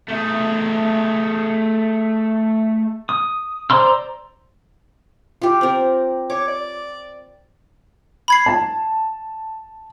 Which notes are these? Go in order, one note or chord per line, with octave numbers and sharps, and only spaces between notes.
A3 G#4
D#6
C5 D5 A#5 C6 E6
F4 G4
C4 A#4
C#5 D6
D5
B5 G#6 C7
A5